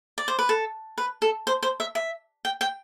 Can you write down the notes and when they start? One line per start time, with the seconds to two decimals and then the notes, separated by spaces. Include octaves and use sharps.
0.18 D5
0.28 C5
0.39 B4
0.49 A4
0.98 B4
1.22 A4
1.47 C5
1.63 C5
1.80 E5
1.95 E5
2.45 G5
2.61 G5